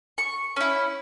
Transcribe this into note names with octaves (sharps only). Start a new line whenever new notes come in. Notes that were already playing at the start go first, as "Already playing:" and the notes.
C#6
C#4 E4